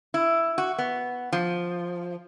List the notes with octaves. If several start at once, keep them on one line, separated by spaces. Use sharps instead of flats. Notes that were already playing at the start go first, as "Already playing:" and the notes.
E4
F#4
B3
F3